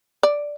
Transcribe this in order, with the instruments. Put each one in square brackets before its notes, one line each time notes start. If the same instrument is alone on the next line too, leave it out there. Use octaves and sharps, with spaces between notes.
[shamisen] D5